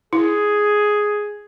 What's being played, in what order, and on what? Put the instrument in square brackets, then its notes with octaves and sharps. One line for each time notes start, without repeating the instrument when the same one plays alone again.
[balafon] E4 [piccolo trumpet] G#4